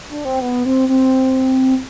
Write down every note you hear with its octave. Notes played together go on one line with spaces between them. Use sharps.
D4
C4
B3
C4
C4